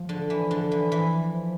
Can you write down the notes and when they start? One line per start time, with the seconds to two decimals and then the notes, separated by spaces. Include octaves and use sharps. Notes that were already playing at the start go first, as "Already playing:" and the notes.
Already playing: F3
0.09 D3
0.30 E3
0.51 D3
0.72 E3
0.92 E3